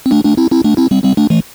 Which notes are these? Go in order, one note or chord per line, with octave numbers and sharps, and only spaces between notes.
C4
A3 D4
A3 D4
C4 E4
C4 E4
A3 D4
C4 E4
G3 C4
G3 C4
A3 D4
E3 A3